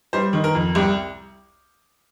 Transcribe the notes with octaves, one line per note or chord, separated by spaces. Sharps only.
G3 C5
D#3
A#4
F2
C2 G4